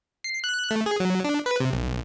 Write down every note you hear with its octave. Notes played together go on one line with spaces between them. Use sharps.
C7
F#6
A3
G#4
F#3
D4
B4
C3
B1